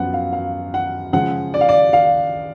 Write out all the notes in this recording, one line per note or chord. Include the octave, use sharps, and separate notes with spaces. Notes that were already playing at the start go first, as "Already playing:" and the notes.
Already playing: F#2 F3 B3 F#5
F5
F5
F#5
C#3 F3 G#3 F#5
D5
F5
D5
F5